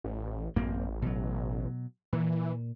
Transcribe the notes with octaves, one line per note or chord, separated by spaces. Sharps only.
A1
A1 F#2 A#3 C4
B2 F#3
A#2 E3